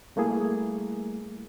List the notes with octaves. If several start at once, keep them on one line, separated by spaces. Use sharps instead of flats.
G3 A3 A#3 E4 G#4